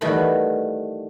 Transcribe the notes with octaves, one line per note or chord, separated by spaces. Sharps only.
D#3 E3 G3 A3 F#4 B5